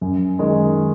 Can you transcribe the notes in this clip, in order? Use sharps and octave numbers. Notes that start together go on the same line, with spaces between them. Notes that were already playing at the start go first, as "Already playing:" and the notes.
F#2
D#3 G#3